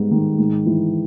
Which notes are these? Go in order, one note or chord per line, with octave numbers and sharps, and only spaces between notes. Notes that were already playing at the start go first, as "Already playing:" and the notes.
Already playing: G#2 G3 B3
D#3
G#2
E3